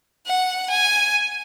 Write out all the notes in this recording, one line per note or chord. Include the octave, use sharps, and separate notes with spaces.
F#5
G#5